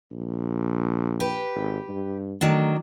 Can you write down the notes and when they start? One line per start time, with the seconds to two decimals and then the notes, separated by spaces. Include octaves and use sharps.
0.12 A#1
1.20 G4 B4
1.55 G#1
1.89 G2
2.41 D#3 F#3 A3 D4